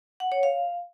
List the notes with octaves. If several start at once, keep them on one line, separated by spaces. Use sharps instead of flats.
F#5
C#5
F5